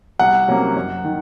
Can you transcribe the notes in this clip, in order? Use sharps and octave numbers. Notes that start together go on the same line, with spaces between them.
C2 F#5
C3 F#3 A#3 C#4
F#2
D#3